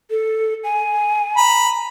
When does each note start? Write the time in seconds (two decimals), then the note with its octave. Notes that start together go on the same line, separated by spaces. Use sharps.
0.10 A4
0.64 G#5
1.37 A#5 B5